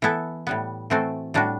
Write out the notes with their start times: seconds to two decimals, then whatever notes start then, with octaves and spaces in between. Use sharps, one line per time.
0.02 E3 B3 E4 A4
0.47 A2 G3 B3
0.90 E3 A3 C4 F#4 A4
1.34 A2 G3 D4 F#4